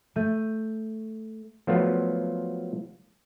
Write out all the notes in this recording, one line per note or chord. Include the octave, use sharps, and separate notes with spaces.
A3 G6 D#7
F3 F#3 A3 B3 F4